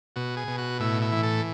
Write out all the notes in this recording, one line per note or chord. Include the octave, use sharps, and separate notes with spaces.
B2 F#4
G#4
B2
F#4
A2 E4
E4
E3
A4